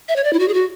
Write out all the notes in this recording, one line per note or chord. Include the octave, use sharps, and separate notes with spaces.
E5
C#5
D5
E4
F#4
G#4
F#4